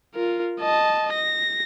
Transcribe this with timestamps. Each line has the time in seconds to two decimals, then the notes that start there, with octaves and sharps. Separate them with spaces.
0.15 F4 A#4
0.60 D#5 A5
1.13 A#6